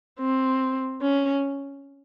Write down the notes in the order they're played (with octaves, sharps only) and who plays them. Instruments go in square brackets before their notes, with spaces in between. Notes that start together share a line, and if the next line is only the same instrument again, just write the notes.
[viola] C4
C#4